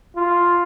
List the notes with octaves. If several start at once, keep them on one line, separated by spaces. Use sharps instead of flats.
F4